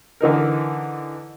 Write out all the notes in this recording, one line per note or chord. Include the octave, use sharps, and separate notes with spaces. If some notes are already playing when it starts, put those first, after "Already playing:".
D3 E3 D#4 A#4